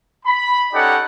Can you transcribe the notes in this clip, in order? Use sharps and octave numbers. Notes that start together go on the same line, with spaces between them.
B5
C#4 D#4 G4 A4 D5 F#5